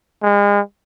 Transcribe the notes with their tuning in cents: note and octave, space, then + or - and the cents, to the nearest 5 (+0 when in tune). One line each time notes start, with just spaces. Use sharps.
G#3 -35